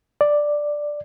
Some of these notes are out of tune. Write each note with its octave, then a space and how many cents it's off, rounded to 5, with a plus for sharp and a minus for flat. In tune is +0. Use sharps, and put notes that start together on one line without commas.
D5 +5